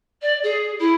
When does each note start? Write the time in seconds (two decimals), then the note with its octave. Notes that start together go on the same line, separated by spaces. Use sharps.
0.22 D5
0.43 G#4
0.79 E4